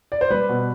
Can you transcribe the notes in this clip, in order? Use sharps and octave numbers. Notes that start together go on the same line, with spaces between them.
D5
C5
G3 B4
B2